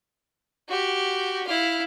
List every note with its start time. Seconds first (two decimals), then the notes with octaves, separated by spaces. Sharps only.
0.69 F#4 G4
1.47 E4 F5